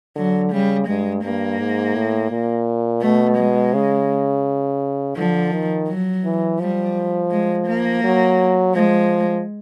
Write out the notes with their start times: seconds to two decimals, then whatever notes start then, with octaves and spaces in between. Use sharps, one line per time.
0.16 D3 F#3
0.52 C#3 G3
0.88 G2 G#3
1.24 G2 A#3
1.59 G#2
1.95 A2
2.31 A#2
3.02 B2 A3
3.38 G#3
3.74 C#3
5.17 D3 F3
5.52 D#3
5.88 F#3
6.24 E3
6.60 F3 G3
7.31 G#3
7.67 A#3
8.03 F#3
8.74 F3 G#3